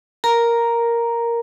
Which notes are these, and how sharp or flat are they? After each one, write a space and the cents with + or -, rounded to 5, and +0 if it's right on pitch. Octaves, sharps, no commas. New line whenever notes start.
A#4 +0 A#5 +0